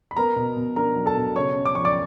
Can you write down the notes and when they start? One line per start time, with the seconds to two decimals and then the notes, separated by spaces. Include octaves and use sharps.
0.11 B5
0.16 B3 A#4 A#5
0.36 B2
0.57 B2
0.76 D4 A#4 A#5
0.96 F#3
1.06 A4 A5
1.16 B2
1.36 C#3 C#5 C#6
1.55 C#4
1.65 D6
1.75 F3 C#6
1.85 D5 D6